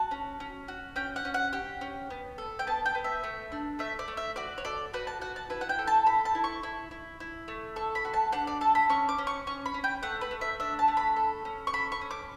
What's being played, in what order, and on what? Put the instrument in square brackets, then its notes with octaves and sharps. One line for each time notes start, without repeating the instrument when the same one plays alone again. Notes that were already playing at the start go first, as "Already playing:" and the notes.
Already playing: [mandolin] F#4 A5
C#4
C#4
F#4
C#4 G5
F#5
C#4
F#5
G4 G5
C#4
B3
A4
G5
B3 A5
G5
B3
E5
A3
D4
A3 E5
D5
A3
E5
F#4 D5
C#5
A4 D5
F#4 B4
A5
F#4 F#5
A5
E4 B4
F#5
G5
A4
A5
A4 B5
A5
E4
C#6
E4
E4
E4
A3
A4 C#6
B5
F#4
A5
D4 F#5
D5
A4 A5
B5
C#4 C#6
D6
C#4
C#6
C#4 C#6
B5
C#4
G5
A3 F#5
B4
A3
E5
D4 E5
A5
A3
B5
A4
C#4
C#6
A4 B5
C#6
C#4
D6